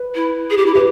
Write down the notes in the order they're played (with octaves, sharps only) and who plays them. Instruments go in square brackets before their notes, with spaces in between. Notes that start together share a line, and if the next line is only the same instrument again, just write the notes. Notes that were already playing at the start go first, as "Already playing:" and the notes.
Already playing: [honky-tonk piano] B4
[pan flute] E4
G#4
G4
E4
[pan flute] G4 [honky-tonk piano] B4